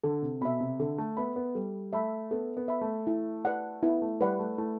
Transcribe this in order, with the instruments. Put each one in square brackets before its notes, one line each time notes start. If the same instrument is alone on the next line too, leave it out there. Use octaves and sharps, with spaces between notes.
[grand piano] D3 [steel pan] A4
[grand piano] C3
[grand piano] B2 [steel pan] E5 B5
[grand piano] C3
[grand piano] D3 [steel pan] A4
[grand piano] A3
[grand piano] B3 [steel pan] E5 B5
[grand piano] B3
[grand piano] G3 [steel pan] A4
[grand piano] A3 [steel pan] E5 B5
[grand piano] B3 [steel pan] A4
[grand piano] B3
[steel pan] E5 B5
[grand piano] A3
[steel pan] E4
B4 D5 F#5
[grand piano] B3 [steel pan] E4
[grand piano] A3
[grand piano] G3 [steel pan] B4 D5 F#5
[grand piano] A3
[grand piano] A3 [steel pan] E4